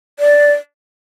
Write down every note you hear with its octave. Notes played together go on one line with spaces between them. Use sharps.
D5